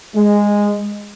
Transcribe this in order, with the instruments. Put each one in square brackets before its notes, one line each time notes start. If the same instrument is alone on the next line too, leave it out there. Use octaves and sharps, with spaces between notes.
[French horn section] G#3